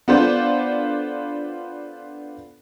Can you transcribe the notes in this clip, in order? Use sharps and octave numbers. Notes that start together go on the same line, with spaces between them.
B3 D4 F4 A4 C5